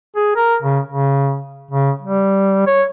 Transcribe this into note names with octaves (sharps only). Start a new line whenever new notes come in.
G#4
A#4
C#3
C#3
C#3
G3
C#5